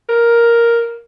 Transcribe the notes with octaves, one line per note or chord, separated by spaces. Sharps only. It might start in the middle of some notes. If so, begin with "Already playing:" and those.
A#4